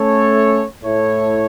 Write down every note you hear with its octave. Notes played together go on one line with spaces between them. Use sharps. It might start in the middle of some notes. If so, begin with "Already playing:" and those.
Already playing: A3 C#4 A4 C#5
A2 A3 E4 A4 C#5